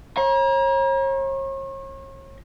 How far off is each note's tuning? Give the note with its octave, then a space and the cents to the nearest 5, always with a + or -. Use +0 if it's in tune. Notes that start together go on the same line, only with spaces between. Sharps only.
C#5 -40 A#5 +35